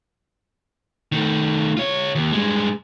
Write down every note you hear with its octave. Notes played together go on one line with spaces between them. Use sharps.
D#3 A3
F4 C#5
D#2
G2 G#3